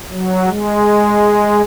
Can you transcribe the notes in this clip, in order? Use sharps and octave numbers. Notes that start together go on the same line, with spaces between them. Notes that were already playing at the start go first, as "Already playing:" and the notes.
F#3
G#3